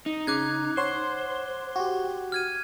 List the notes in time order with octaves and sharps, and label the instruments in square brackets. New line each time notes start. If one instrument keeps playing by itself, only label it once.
[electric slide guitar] D#4
[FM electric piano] C#3 [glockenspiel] D6 F#6 G#6
[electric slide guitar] C5 [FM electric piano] C#5 F#5 C6
[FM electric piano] F#4 G4
[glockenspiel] F6 G#6 D#7